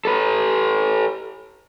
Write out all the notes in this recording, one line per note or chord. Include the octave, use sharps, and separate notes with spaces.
A4 B4